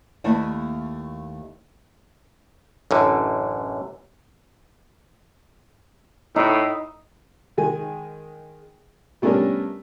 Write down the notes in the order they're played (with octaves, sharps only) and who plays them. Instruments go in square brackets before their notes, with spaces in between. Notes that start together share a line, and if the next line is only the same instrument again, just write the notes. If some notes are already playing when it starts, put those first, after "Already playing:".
[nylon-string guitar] D#2 A3 A#3 E4 D#5 A5
[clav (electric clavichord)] A1 F#2 D3
[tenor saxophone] A2 [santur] D#4 D#5
[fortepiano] D#3 G#3 G#5
G3 A3 B3 C#4 D4 A#4